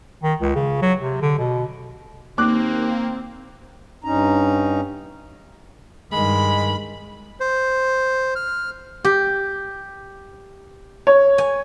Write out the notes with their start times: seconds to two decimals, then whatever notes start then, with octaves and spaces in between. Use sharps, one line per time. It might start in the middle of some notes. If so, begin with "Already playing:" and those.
0.23 D#3
0.40 C#2
0.56 C#3
0.82 F#3
1.01 C3
1.22 D3
1.39 B2
2.38 D#2 A#3 C4 D6 F#6
4.04 G2 C#4 D#4 A#5
6.12 G2 D#3 G#3 B5
7.40 C5
8.35 F6
9.05 G4
11.07 C#5
11.38 G#5